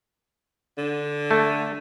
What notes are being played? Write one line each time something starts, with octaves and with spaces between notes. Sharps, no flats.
D3
A3